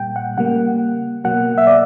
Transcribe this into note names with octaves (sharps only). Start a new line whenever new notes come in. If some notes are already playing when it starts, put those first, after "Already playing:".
Already playing: A#2 G3 A#3 G5
F#5
C#3 G3 A#3 F#5
B2 F#3 A#3 F#5
E5
D5